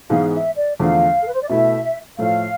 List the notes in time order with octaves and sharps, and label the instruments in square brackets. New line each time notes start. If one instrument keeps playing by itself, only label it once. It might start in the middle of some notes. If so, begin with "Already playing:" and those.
[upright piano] G#2 E3 G#3 B3 [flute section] F5
[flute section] E5
D5
[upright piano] E2 D3 F3 A3 [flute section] F5
[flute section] A4
B4
C5
D5
[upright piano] B2 A3 E4 [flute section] E5
[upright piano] A2 F3 A3 [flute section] F5